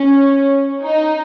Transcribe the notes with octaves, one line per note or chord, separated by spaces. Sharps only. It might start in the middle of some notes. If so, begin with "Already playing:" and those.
Already playing: C#4
D#4